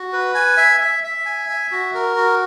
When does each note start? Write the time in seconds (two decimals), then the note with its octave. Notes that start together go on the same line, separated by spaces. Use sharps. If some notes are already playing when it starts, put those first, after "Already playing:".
Already playing: F#4
0.13 B4
0.35 G#5
0.57 E5
0.81 E5
1.04 E5
1.26 G#5
1.49 E5
1.71 F#4
1.94 A#4
2.17 F#4